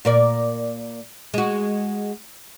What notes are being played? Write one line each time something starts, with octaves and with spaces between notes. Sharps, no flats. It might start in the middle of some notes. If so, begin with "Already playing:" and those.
A#2 A#4 D5
G#3 F#4